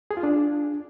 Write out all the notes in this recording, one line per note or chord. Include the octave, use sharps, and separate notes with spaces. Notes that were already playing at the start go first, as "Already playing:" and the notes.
G#4
F4
D4